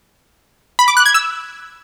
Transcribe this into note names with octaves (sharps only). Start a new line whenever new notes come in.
B5
D6
F#6
G#6
E6